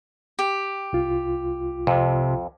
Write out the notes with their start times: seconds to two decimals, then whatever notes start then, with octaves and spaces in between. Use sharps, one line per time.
0.39 G4
0.93 C2 F4
1.87 F2 C3